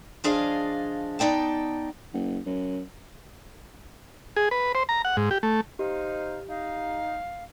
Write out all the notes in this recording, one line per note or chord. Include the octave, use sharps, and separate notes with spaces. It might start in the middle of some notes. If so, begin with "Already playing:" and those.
F3 D4 G#4 D5 D#5 F5
B3 D#4 D5 G5 A5
F#1
F#2
G#4
B4
C5
A#5
F#5
G#2
G4
A3
D#4 G4 C5 F5
D#4 F5